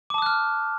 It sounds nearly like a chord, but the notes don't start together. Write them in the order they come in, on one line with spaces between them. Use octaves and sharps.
D6 A5 D#6 F#6 F6